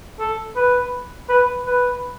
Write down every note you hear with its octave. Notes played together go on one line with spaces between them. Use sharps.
A4
B4
B4
B4